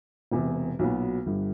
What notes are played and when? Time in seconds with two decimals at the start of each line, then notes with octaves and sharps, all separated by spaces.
0.31 E1 E2 C3
0.79 B1 A#2 F#3 B3
1.26 G1 G2 D3